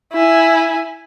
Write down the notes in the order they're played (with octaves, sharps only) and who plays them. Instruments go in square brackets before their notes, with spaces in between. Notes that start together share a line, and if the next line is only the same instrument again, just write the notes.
[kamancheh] E4 G#5